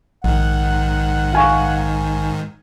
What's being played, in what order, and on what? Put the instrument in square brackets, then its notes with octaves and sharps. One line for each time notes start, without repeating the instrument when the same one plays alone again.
[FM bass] A#1 [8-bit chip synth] G#2 D#3 [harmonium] F#5
[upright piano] F5 G#5 C#6